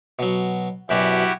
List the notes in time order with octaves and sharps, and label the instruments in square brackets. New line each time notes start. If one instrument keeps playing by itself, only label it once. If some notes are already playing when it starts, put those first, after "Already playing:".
[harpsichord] B2 F#3
[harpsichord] F#2 B2 D5 [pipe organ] E4 F#4 G4